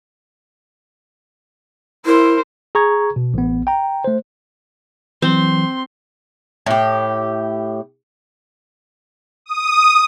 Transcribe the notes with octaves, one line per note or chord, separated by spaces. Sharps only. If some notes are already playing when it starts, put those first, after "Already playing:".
E4 A#4 C5
G#4 A#5 C#6 G#6
B2
A1 B3
G5 A#5
A3 C5
E3 F#3 C4 C6
A2 G4
D#6